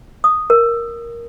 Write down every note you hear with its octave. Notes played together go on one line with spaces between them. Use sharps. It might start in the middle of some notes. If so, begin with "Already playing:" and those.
D#6
A#4